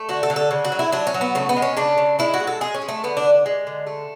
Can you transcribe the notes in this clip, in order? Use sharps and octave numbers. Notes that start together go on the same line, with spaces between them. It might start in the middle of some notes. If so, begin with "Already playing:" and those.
Already playing: A3
D3 F#4
A4
D3
A4
C#3
F#4
F#3
E4
F#3 D4
C#4
F#3
B3
C#3 A3
B3
G#3
C#4
C#3 D4
C#3
G#3 E4
F#4
G#3
A4
G#3 G#4
C#4
G#3
A3
D3 B3
D4
D3
G#3
D3
A3